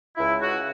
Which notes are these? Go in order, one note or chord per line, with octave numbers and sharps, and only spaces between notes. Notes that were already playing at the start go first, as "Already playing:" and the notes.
C#2 E4
C#3 F#4